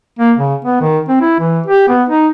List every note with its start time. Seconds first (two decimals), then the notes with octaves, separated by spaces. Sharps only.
0.19 A#3
0.37 C#3
0.65 B3
0.81 D#3
1.09 C4
1.21 E4
1.40 E3
1.66 G4
1.89 B3
2.09 D#4